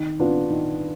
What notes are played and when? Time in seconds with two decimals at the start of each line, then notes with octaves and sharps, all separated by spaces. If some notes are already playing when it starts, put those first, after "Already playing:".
Already playing: D#3
0.20 B3 D4 F4
0.50 D#3